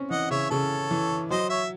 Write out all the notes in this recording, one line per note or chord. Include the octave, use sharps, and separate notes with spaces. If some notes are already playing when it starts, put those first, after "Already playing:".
Already playing: C4 C#4
E3 D#5 F#5
C#3 C#5 E5
C#3 A4 C#5
E3
F#3 C5 D#5
C#5 E5